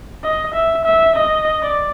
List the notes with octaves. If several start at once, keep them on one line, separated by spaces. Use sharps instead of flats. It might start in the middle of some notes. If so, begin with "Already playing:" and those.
D#5
E5
E5
D#5
D5